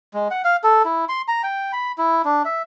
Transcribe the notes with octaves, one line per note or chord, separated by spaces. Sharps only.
G#3
F#5
F5
A4
E4
C6
A#5
G5
B5
E4
D4
E5